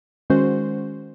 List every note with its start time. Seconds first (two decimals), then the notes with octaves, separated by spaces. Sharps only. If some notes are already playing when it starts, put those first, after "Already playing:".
0.30 D#3 G#3 C#4 F#4 C5